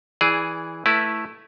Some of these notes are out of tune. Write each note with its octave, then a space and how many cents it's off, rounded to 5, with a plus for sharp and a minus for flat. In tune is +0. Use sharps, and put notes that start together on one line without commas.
E3 -10 G#4 +0 D5 -5
A3 +0 E4 +0 B4 -15